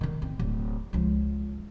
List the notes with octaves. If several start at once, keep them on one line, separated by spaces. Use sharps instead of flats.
D3 D#3
A1 C4
D1
C#2 F3